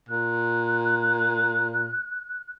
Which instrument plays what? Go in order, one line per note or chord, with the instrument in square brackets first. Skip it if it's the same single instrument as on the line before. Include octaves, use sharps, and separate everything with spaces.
[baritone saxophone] A#2 [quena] F#6